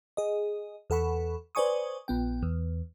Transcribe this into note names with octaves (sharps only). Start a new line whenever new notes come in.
G#4 D#5
E2 A4 F#5 B5 C#6
B4 C5 D5 G#5 C#6 D#6
A#1 B3 G5
E2